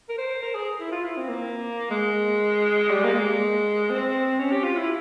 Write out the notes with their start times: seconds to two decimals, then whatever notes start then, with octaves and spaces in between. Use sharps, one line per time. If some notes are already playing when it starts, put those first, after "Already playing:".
0.09 A#4
0.18 C5
0.43 A#4
0.55 G#4
0.80 E4
0.92 F4
1.05 E4
1.17 C4
1.29 A#3
1.91 G#3
2.91 G3
3.04 A#3
3.15 G#3
3.90 C4
4.39 C#4
4.52 G4
4.64 F4
4.77 E4